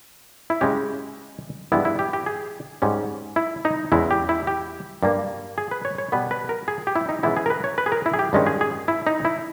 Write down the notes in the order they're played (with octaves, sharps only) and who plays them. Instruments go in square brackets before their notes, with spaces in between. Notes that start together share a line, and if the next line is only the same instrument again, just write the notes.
[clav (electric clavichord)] E4
C#3 G#3 C#4 G4
G2 E3 G#3 B3 E4
E4
G4
G4
G#4
G#2 G3 C#4
E4
D#4
E2 C#3 G#3 E4
G4
E4
G4
G2 G3 A#3
G#4
B4
C#5
C#5
B2 G3 B3 B4
B4
A#4
G#4
G4
E4
D#4
C#3 E3 G#3 B3 E4
G#4
A#4
B4
C#5
B4
G#4
A#4
E4
G#4
G4
G2 D#3 G#3 C#4
G#4
G#4
E4
D#4
E4